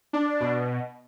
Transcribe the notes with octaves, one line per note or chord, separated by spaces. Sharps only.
D4
B2